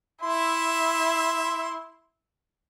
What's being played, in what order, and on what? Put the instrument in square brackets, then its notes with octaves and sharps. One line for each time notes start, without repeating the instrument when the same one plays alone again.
[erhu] E4 [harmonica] E5 C6